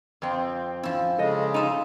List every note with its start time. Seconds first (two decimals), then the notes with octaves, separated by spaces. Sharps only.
0.22 F2 C4 F4
0.83 F3 C#4 E4
1.18 C#3 G#3 A4 D#5
1.54 D#4 F4 E5